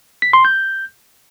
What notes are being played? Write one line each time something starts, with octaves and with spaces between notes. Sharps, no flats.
B6
C6
G6